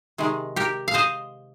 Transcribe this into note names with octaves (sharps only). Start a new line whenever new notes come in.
C3 D#3 G#3
G4 A#4
F5
C5 D#5